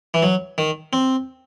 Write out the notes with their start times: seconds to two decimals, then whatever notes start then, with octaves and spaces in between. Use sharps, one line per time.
0.14 E3
0.22 F#3
0.58 D#3
0.93 C4